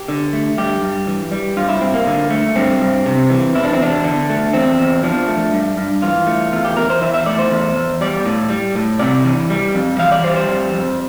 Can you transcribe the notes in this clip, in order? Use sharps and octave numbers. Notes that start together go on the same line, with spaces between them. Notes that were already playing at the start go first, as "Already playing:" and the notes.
Already playing: G4
D3
A3
G2 G4
G2
E3
G3
G2 F4
E4
G2 C4
A#3
D3
A3
G2 C4
G2
C3
E3
E2 E4
D4
C4
E2 D4
D3
A3
E2 C4
E2
F3 D4
A3
G2
G2
E3 F4
A3
E2 F4
G4
E2 A#4
C5
E3 E5
E5
A3 D5
C5
E2
E2
G3 D5
A2
G3
A2
C3 D5
E3
G3
F2
E3 F5
D5
G3 C5
C5
F2
F2